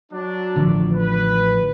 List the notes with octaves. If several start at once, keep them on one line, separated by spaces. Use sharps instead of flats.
F#3 D4
A1 D3 F3
B4